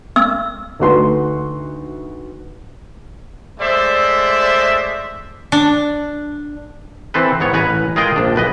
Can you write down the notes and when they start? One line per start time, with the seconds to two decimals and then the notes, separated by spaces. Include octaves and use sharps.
0.16 E6
0.80 D2 A3 D#4 F#4 B4 C6
3.60 G#3 A3 C5 D5 E5
5.52 D4
7.14 E3 C4 A4 B4
7.40 G#2 B3 C#5
7.53 A1 B4 G#5 A#5
7.96 G#3 F4 G#4 A#4 D#5 G5
8.16 A#1 D4
8.36 B1 B4 D#5